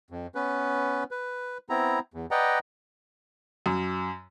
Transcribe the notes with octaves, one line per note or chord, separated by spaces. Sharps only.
F2
B3 C#4 B4
B4
B3 C4 E4 A#5
E2
B4 D5 D#5 F#5 G5 A#5
F#2